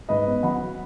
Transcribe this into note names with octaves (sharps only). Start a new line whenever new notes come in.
G#2 B4 D#5
B3
F#3 F#5 B5